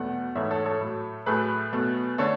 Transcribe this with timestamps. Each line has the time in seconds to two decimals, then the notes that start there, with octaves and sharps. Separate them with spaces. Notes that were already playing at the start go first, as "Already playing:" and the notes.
Already playing: E2 B2 F#3 A3 F#5
0.35 G#2 E3 A3 C#5 E5
0.51 A4 C#5
0.65 A4 C#5
0.81 A2 F#3 A3
1.26 A2 F#3 A3 G#4 B4
1.72 B2 F#3 A3
2.18 D3 A3 A4 C#5